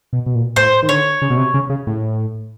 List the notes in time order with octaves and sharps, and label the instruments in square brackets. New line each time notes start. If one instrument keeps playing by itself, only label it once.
[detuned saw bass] B2
B2
A#2
[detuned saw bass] A2 [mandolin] C5
[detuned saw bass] D#3
[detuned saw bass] D3 [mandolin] C#5
[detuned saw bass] C#3
B2
C3
C#3
C#3
A2